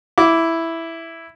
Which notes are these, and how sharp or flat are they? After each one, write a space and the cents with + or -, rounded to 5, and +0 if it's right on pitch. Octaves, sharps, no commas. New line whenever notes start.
E4 +0 D6 -10